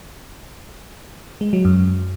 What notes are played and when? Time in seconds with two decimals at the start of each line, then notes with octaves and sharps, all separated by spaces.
1.41 G#3
1.53 F#3
1.65 F#2